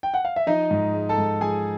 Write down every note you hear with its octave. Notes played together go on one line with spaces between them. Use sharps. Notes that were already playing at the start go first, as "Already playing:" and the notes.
G5
F#5
F5
E5
F3 D#4 D#5
G#2
G#3
A4 A5
G#2
F3 G#4 G#5